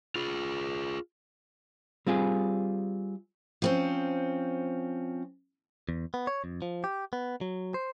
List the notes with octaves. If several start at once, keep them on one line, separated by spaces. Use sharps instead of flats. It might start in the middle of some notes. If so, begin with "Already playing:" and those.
F4 G#4
G3 C4 F4 G#4
F3 C4 C#4
E2
B3
C#5
F2
F3
G4
B3
F#3
C5